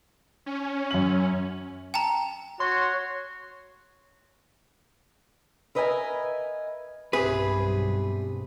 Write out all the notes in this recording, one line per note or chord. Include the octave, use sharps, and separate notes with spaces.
C#4
F#2 F#7
G5 A5 A#5
F#4 C#5 C6
A#4 B4 D#5 E5 G5 G#5
B1 G2 C3 G#4 B4